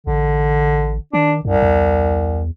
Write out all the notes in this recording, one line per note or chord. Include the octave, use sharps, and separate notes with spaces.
A1 D3
D#3 D4
C2 F#2
E2